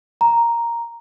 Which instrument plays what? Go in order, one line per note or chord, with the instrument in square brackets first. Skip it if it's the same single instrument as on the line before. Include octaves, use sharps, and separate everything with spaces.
[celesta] A#5